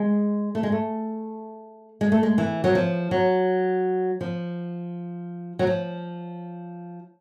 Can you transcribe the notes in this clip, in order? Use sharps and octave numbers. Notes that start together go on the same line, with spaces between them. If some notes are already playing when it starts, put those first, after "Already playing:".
Already playing: G#3
A3
G#3
A3
G#3
A3
G#3
E3
F#3
F3
F#3
F3
F#3
F3